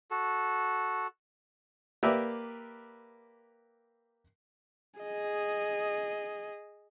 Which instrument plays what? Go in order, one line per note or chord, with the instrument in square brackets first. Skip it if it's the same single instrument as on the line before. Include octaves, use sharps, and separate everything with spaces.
[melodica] F#4 A4
[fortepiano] A#3 G4 A#4 B4 D5 E5
[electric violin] G#4 D#5